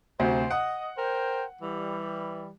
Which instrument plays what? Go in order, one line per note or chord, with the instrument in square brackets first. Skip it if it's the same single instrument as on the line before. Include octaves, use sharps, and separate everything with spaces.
[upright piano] D2 C3 F#3 [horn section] C5
[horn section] D#5 [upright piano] F#5
[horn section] A#4 C5 G5
E3 G3